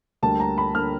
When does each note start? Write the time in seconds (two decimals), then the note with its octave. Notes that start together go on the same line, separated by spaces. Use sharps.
0.22 D2 D3 G3 A#3 A5
0.40 A#5
0.58 B5
0.75 D3 G3 A#3 F6